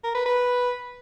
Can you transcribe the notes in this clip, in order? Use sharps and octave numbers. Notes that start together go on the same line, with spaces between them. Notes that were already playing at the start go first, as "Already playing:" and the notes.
A#4
B4
B4